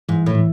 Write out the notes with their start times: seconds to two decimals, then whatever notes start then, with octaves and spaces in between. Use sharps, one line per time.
0.09 G#2 E3
0.26 A2
0.35 E3